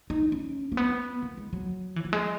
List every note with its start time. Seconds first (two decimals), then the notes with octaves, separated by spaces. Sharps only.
0.10 D#4
0.32 C#4
0.72 A#3
0.77 B3
1.22 A#3
1.37 G#3
1.53 F#3
1.96 E3
2.05 F#3
2.13 G#3